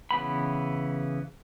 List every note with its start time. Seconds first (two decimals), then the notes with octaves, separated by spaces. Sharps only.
0.11 C#3 E3 B3 B5